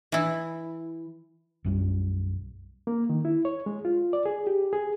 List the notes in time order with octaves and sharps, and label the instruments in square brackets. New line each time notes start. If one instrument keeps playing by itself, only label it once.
[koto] E3 E4
[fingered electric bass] B1 F#2 G3
[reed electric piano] A#3
D#3
E4
C#5
G#3
F4
D5
G#4
G4
G#4